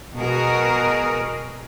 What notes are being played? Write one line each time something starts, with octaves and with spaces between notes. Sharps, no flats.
B2 F#4 G#4 A#4